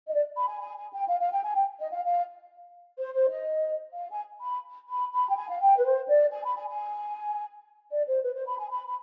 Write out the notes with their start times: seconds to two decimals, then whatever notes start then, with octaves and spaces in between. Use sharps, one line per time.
0.07 D#5
0.12 D5
0.36 B5
0.48 G#5
0.60 G#5
0.76 G#5
0.92 G5
1.08 F5
1.20 F5
1.32 G5
1.43 G#5
1.56 G5
1.79 D#5
1.92 F5
2.04 F5
2.98 C5
3.14 C5
3.30 D#5
3.94 F5
4.10 G#5
4.41 B5
4.89 B5
5.13 B5
5.29 G5
5.37 G#5
5.49 F5
5.60 G5
5.78 B4
5.84 C5
6.08 D5
6.32 G#5
6.44 B5
6.56 G#5
6.68 G#5
7.91 D5
8.07 C5
8.23 B4
8.35 C5
8.46 B5
8.58 G#5
8.70 B5
8.87 B5